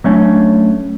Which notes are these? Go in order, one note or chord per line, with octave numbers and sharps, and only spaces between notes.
F#3 A3 C#4 D4